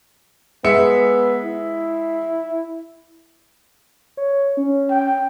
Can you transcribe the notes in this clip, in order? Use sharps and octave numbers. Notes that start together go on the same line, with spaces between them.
G#3 B3 E5 C#7
E4
C#5
C#4
G5